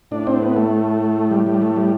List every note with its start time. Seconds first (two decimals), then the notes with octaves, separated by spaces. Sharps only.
0.12 A2 D4
0.27 C4
0.42 B3
0.56 A3
1.31 G3
1.46 G3
1.62 A3
1.76 G3